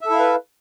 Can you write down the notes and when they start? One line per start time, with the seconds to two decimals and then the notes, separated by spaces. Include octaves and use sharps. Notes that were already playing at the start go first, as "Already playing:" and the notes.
0.01 E5
0.06 A4
0.10 E4
0.15 F5
0.19 B4